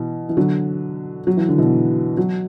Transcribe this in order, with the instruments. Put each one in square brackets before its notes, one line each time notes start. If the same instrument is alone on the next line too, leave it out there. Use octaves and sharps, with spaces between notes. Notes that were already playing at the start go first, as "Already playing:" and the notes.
Already playing: [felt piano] B2 E3
E3
D3 F#3
F#3
E3
D3
B2 E3
F#3